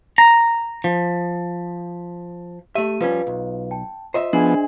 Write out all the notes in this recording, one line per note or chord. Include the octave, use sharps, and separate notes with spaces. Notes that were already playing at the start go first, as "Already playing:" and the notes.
A#5
F3
A3 G4 E5 D#7
F3 G3 C#4 F4 B4 F5
B1
G5 A5
F4 C5 D#5 E5
F3 B3 D4 G#4 G#5 F#7